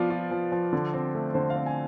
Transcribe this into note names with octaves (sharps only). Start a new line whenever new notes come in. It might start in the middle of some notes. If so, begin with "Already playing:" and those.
Already playing: F3 B3 F4 D5
F4
F3
F3
D3
C4
A3
D3 C5
F5
C4
G#5